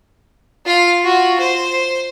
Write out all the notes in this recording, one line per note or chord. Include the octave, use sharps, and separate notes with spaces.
F4 F5
F4 F#4
C5